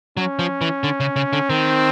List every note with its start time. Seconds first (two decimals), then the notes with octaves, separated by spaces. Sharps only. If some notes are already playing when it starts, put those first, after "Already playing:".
0.17 F#3 C#4
0.39 F3
0.61 E3
0.84 D3
1.00 C#3
1.16 C#3
1.33 D3
1.50 D#3 C4